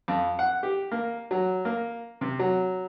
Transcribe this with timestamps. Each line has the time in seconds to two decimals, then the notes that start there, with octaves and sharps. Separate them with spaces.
0.08 F2
0.39 F#5
0.63 G4
0.91 A#3
1.31 F#3
1.65 A#3
2.21 C3
2.39 F#3